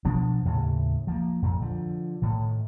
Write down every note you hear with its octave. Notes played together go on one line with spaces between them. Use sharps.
B2 F3 B3 D4
D#2 A2 C#3
F3 A#3
F2 A#2
D3 F3
A2 D#3